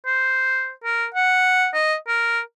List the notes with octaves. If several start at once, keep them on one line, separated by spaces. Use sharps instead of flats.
C5
A#4
F#5
D#5
A#4